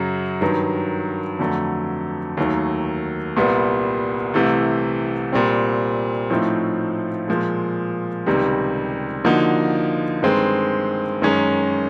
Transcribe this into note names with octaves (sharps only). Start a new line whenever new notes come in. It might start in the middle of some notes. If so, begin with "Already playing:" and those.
Already playing: F#2 C#3 F#3
G2 D#3 F#3
F2 D3 F#3 A3
D#2 D#3 F#3 A3
C2 A#2 G3 B3
C2 C3 E3 A3
A#2 G3 C4
A2 F3 A3 C4 D#4
A#2 F3 G#3
C#2 C3 D#3 G3
D3 F3 A#3 D#4 F#4
G2 D#3 G#3 C4
F#2 D#3 G#3 C#4